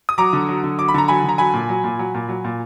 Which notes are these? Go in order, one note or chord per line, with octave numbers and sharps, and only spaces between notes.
D#6
F#3 A#5 D6
D3
F#3
D3
F#3 D6
B5
D3 A#5
F#3 G#5 B5
D3
A#5
F#3 G#5 B5
A#2
F#3
A#2
F#3
A#2
F#3
A#2